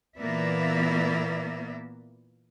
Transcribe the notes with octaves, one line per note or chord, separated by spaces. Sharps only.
A#2 E3 A#3 B3 D5 E5